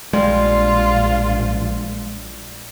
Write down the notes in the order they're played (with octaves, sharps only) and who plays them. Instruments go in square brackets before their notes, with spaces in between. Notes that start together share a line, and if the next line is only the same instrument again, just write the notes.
[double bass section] A#1 [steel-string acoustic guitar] G3 [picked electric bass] G#3 [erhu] F4